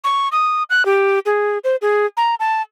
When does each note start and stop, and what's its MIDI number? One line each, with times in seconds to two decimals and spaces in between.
0.04 0.29 85
0.32 0.63 87
0.70 0.85 90
0.85 1.19 67
1.26 1.58 68
1.64 1.76 72
1.82 2.06 68
2.17 2.35 82
2.40 2.62 81